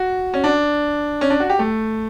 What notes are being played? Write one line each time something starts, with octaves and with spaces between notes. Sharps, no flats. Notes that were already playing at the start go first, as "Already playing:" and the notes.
Already playing: F#4
C#4
D4
C#4
D4
F#4
G4
A3